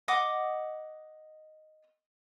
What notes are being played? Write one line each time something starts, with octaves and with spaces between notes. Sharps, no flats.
D#5 F#5 D6 D#6